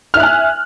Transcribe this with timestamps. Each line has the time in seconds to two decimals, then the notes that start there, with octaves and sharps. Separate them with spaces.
0.14 F6
0.17 E5
0.20 F#6
0.23 G#5